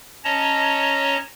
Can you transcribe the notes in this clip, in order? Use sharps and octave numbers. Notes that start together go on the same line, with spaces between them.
C#4 C#5 D#5 A5 A#5